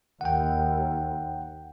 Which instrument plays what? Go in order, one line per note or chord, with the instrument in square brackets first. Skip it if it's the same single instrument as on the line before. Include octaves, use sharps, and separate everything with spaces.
[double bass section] D#2 [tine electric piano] F#5 G5